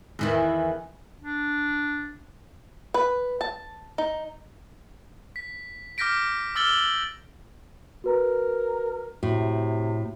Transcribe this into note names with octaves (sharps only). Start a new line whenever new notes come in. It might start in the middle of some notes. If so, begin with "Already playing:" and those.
E2 D#3 E3
D4
B4
A5
D#4
B6
D6 F6 G6 A#6 B6 D7
D6 E6 F6 A6 F#7 G7
F#7
F#4 A#4 B4 A#5
A2 C3 F#4